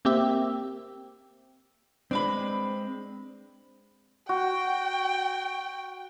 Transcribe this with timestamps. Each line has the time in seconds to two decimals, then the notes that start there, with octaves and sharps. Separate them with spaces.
0.05 A#3 C4 G4 E5
2.11 G#3 C4 D4 B4 B5
4.29 F#4 G5